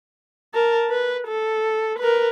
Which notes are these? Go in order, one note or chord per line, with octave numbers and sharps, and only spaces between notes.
A#4 A5
B4
A4
A#4 B4